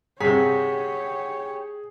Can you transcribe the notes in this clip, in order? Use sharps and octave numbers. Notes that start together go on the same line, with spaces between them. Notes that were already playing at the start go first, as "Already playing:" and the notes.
G2 C3 G4 G#4 C#5 F#5 A#5 B6